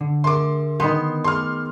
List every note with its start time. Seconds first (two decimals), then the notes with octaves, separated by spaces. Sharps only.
0.01 D3
0.24 G#4 A#4 E5 C6 D6
0.80 D#3 B3 C6
1.24 G#4 C6 D6 F6